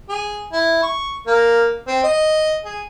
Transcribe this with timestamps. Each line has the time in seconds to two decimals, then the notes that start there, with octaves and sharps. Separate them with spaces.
0.09 G#4
0.52 E4
0.83 C#6
1.27 A#3
1.88 C4
2.04 D#5
2.65 G#4